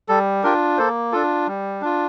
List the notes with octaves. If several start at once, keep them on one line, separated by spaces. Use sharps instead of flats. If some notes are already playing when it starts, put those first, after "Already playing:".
G3 A4
D4 F4 G4 A#4
A#3 A4 C5
D4 F4 A4
G3
D4 F4